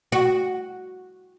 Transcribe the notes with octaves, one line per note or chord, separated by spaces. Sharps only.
F#4